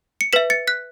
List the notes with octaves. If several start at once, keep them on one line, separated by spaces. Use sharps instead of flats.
C#7
B4 E5 B6 E7
A6 C#7
F#6 B6